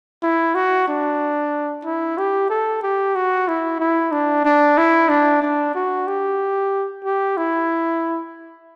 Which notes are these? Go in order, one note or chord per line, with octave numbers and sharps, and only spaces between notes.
E4
F#4
D4
E4
G4
A4
G4
F#4
E4
E4
D4
D4
E4
D4
D4
F#4
G4
G4
E4